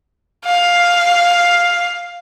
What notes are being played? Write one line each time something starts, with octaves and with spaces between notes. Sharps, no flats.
F5